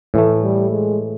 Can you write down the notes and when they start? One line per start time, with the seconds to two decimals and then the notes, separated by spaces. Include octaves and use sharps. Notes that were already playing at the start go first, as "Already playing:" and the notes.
0.14 A2 E3 A3
0.43 G3
0.71 G#3